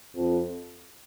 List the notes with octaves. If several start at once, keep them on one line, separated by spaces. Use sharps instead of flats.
F2